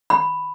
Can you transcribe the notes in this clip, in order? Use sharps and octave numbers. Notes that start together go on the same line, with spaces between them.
B5